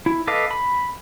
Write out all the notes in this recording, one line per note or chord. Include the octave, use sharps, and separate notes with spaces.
E4
A4 B4 D#5 F5 D6
B5